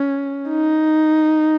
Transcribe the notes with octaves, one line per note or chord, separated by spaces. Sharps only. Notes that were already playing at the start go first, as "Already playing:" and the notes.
Already playing: C#4
D#4